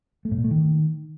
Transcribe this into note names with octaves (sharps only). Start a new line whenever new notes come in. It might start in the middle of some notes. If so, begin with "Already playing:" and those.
A3
A2
A#2
A3
D#3